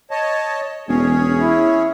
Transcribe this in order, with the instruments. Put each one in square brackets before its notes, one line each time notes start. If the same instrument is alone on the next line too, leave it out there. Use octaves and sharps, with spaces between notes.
[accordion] C#5 D#5 A5
[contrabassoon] E1 [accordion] C#4 G#4 C#5
[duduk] E4